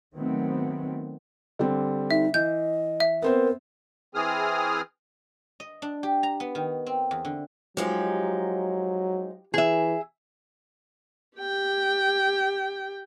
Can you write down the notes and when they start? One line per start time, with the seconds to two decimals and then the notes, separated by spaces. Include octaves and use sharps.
0.14 D#3 F#3 A3 B3 C4
1.59 D3 G3 C4
2.11 D#4 E5
2.34 E3 D#5 G6
3.00 E5
3.22 B3 C4 A#4 C5
4.15 E3 C4 G#4 D#6 F6
5.60 D#5
5.82 D4
6.03 G4
6.23 A#5
6.40 B3
6.55 D#3
6.86 C4
7.11 E2
7.25 D3
7.77 F3 F#3 G#3 D#4 G4
9.54 E3 G#4 E5
11.38 G4 G5